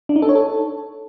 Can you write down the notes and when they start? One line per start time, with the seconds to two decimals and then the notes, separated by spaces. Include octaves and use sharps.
0.09 D4
0.16 D#4
0.22 A4
0.29 C#5
0.35 A4